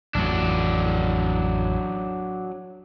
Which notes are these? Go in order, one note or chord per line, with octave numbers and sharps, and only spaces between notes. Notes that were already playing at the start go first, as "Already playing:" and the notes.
A1 F2 F#3 D4